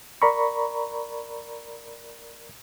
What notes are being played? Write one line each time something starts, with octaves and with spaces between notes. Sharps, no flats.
A#4 D5 A#5 B5 C#6